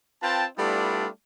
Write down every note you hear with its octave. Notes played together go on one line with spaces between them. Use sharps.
C4 F4 B4 G5 A5
G3 A3 B3 D4 E4 F4